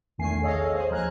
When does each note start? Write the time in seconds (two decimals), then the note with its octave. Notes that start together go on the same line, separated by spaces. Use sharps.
0.18 A#1 E2 D#3 A3 G#5 C7
0.42 G#4 A4 C#5 D#5 F5
0.75 G#4 C5 D#5 G#5
0.90 D#2 F3 A#5 F6 F#6 G#6